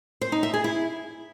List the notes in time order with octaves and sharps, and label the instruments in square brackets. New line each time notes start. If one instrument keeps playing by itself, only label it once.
[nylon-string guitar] C5
D#4
E5
G#4
E4